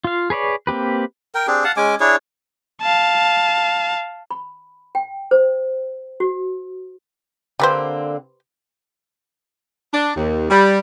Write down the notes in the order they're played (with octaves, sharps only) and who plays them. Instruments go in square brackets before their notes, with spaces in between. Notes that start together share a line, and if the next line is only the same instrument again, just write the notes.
[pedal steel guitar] F4 F5
G#4 B4 C#5 D5
A#3 C4 G4 B4
[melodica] A#4 G5
C4 D4 G4 G#4
F5 F#5 A5
G#3 C#4 G#5 D6
D4 E4 G#4 C#5
[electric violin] F5 A5
[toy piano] B5
G5
C5
F#4
[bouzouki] D3 A#3 C4 [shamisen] G4 B4 C5
[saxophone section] D4
D#2
G3